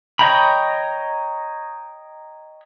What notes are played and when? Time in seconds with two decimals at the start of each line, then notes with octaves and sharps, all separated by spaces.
0.19 C#5 D#5 G5 A#5 B5